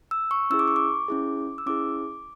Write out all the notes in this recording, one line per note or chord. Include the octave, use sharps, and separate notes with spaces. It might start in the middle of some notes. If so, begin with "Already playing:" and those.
E6
C#6
C#4 E4 G#4 E6
D6
C#6
D6
C#4 E4 G#4
E6
C#4 E4 G#4 D6